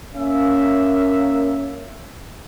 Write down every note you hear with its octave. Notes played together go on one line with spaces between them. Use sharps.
A#3 C#4 E5